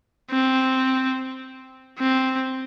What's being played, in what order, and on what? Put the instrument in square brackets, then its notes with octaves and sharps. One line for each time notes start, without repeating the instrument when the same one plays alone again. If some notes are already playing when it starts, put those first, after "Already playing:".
[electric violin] C4
C4